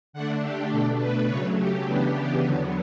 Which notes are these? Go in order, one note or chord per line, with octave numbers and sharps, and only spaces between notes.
D3 A3 D4 F#5
G4
B2 A3 D4 A4
B4
C#3 F#3 A3 C#5
G4
C#3 E3 B3 D4 G4
E2 D3 F#3 B3